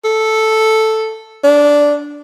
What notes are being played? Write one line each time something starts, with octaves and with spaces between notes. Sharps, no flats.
A4
D4